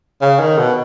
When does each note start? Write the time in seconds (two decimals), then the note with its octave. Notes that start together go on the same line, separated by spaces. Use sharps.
0.21 C#3
0.40 D#3
0.58 B2